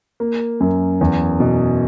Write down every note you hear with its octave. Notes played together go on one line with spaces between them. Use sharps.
A#3
F#2
E2
B2